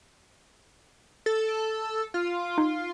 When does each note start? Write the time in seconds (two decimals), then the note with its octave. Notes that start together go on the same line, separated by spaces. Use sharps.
1.26 A4
1.49 D7
2.14 F4
2.58 D#4